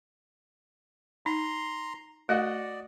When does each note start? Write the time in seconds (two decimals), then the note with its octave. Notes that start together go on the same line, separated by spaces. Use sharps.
1.26 D#4 A#5 C6
2.29 A3 F#4 D5 D#5 F#5